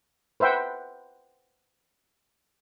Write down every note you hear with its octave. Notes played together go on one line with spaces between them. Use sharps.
B4 C5 E5 F#5 G5